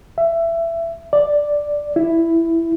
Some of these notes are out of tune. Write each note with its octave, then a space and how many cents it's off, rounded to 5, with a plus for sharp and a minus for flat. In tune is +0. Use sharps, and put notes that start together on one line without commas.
E5 +20
D5 +0
E4 +5